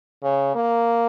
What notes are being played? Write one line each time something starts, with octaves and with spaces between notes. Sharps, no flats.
C#3
A#3